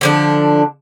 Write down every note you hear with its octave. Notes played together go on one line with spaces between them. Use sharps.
D3 F3 D4